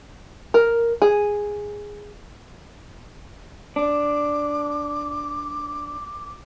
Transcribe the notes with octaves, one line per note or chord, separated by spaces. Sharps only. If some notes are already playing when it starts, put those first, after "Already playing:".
A#4
G#4
D4 D6